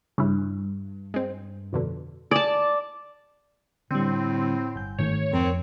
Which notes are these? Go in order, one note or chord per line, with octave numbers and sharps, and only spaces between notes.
G2 C#3 E4
G#3 C4
F2 B2 D3
G#4 D5 A5
A2 D3 G3 C4
G1 G6
G#2 D#3 A3 C#5
F1 F2 F3 C4 A#4